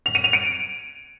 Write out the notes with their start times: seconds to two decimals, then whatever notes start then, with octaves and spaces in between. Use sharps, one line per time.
0.06 F7
0.15 D#7
0.24 F7
0.33 D7